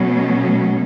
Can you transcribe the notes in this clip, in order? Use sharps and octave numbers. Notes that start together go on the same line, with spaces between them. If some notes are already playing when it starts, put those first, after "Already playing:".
Already playing: B2 F#3 A3 C#4